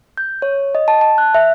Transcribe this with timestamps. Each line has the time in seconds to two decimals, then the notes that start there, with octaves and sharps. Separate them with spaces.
0.17 G6
0.42 C#5
0.75 D#5
0.88 A5
1.01 A5
1.18 F#6
1.35 E5